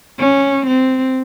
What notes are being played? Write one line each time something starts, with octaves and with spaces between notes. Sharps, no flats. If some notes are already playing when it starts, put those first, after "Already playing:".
C#4
C4